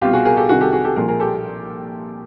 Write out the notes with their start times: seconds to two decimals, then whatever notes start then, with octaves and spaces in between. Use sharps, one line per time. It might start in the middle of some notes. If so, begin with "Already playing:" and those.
0.01 C2 B2 F4 G4
0.13 F#4 G#4
0.25 G#4 A#4
0.37 G4 A4
0.49 C2 C3 D#3 F#4 G#4
0.61 G4 A4
0.73 F#4 G#4
0.84 G4 A4
0.96 A#1 A#2 F3 G#4 A#4
1.08 G#4 A#4
1.20 G4 A4